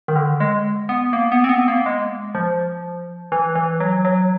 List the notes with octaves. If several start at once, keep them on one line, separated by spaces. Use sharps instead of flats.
D#3
D3
G#3
B3
A#3
B3
C4
B3
A#3
G#3
F3
E3
E3
F#3
F#3